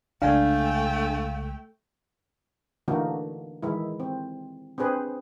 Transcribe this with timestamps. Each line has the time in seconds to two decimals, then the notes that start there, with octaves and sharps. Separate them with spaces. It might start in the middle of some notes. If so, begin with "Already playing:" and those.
0.22 C2 C#3 G#3 A3 D4 F5 G5 G#5
2.88 D3 E3 A3 A#3 D#4 F#4
3.63 D#3 E3 G#3 E4
4.00 C4
4.78 C4 D4 G#4 B4 C5